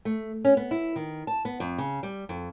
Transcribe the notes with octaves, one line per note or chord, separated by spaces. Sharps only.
A3
C#4
B3
E4
D#3
A5
B3
F2
C#3
G3
F2